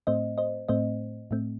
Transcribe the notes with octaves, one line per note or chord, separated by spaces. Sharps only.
A2 A3 C4 C5 D#5
C5 D#5
A2 A3 C4 C5 D#5
A2 A3 C4